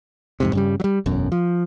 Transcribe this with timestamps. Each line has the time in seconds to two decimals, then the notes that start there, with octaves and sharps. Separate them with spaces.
0.40 F2 G#2 C3
0.53 G2 C#3 G3
0.80 F#3 G3
1.06 E1 B1 F#2
1.32 F3